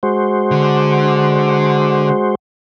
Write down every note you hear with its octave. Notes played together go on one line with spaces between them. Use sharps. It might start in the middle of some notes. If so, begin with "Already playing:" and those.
G#3 F#4 C5
D3